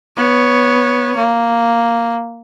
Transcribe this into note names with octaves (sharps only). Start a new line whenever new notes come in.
B3 C#5
A#3